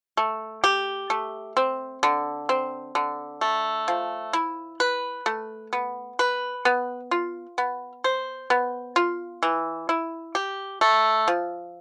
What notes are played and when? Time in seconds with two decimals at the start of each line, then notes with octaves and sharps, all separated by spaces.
0.17 A3
0.64 G4
1.10 A3
1.57 C4
2.03 D3
2.49 C4
2.95 D3
3.41 A3
3.88 F3
4.33 E4
4.80 B4
5.26 A3
5.73 B3
6.19 B4
6.65 B3
7.11 F4
7.58 B3
8.04 C5
8.50 B3
8.96 F4
9.43 E3
9.89 E4
10.35 G4
10.81 A3
11.28 F3